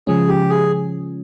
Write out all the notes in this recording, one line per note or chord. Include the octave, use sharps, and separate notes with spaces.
C#3 F3 G#3 C#4 G#4
G4
G#4